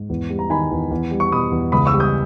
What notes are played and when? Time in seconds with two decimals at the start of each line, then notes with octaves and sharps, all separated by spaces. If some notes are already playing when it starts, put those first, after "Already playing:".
Already playing: G#2
0.10 E2
0.30 G3
0.39 A#5
0.50 D#3 G#5 B5
0.71 E2
0.91 E2
1.11 G3
1.20 C#6
1.31 B2 B5 D#6
1.52 E2
1.72 C#2 B5 D#6
1.86 C#6 E6
1.94 G3
2.00 D#6 G6